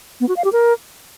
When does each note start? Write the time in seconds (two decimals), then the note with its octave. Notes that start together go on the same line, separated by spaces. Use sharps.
0.20 B3
0.28 F#4
0.36 F5
0.44 G4
0.52 A#4